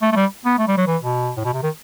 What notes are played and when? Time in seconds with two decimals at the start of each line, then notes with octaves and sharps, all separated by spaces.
0.02 A3
0.12 A3
0.16 G3
0.45 B3
0.59 A3
0.68 G3
0.78 F#3
0.87 E3
1.02 B2
1.37 A2
1.45 B2
1.54 C3
1.63 D#3